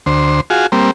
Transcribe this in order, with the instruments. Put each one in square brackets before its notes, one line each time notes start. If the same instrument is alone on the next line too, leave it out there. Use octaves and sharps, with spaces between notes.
[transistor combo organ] D2 C5
F4 F#4 G#4
G3 A#3 C4